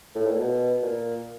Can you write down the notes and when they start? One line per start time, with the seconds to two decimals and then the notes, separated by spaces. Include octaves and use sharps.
0.15 A2
0.27 A#2
0.39 B2
0.83 A#2